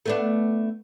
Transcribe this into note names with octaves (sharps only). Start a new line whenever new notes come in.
A3 B3 D4